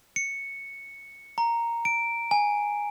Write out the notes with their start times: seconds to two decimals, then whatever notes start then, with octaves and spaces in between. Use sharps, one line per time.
0.16 C#7
1.38 A#5
1.85 D7
2.31 G#5